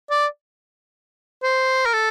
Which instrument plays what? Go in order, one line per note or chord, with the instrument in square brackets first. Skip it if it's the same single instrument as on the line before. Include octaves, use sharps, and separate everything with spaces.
[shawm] D5
C5
A#4
A4